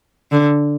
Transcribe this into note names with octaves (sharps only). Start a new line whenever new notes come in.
D3